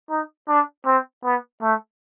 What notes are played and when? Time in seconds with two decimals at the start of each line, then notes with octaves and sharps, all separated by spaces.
0.10 D#4
0.48 D4
0.86 C4
1.24 B3
1.62 A3